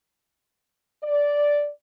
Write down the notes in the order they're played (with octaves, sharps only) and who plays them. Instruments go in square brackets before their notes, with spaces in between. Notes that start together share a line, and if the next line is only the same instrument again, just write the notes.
[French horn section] D5